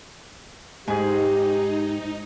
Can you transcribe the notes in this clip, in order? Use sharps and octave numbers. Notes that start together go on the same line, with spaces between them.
G#2 D#4 G4 G#4 G#5